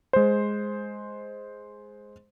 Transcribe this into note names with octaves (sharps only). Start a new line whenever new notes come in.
G#3 C5